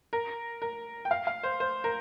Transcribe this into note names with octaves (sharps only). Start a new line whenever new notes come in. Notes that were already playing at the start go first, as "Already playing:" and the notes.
A#4
A#4
G5
F5
F5
C5
C5
A#4